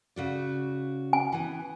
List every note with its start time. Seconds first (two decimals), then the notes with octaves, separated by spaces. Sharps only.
0.16 C#3 F#4 D5
1.13 G#5
1.32 E3 B3